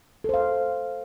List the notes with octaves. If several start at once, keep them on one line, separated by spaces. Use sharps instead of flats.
A4 C5 F5